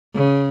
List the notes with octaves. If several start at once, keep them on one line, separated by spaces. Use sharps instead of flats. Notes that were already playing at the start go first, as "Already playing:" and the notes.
C#3